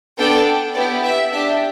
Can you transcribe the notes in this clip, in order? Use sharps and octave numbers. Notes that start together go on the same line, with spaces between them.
B3 D4 A4 G5
B3 E4 G4 D5
E5
D4 G4 E5